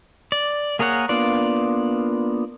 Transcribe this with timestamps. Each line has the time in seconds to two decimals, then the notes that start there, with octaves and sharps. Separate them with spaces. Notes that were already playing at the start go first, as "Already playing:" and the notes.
0.32 D5
0.79 A#3 G#4 A#4 C#5 F#5
1.09 A#3 B3 D4 F4 D5